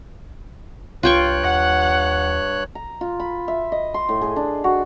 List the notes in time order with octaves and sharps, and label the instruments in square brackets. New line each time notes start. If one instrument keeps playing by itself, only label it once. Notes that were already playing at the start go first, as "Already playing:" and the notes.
[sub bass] C2 [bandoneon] G2 C#5 F#6 [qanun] F4 G5 C#6
[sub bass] D#2 [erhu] F#5
[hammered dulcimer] A#5
F4
B5
E5
D#5
C6
A2
G#4
D4
F#4